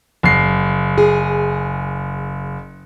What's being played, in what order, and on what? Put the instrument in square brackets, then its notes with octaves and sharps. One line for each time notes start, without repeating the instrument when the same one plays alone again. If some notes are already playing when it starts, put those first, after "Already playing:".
[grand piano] F#1 C7
[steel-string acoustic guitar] G#4